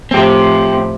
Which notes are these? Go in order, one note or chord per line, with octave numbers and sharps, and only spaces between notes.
A2 C3 F3 C4 G4